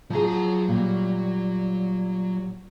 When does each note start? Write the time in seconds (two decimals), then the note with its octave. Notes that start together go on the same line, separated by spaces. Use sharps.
0.10 F3 F#3 G#4 A#5
0.68 A#2 G3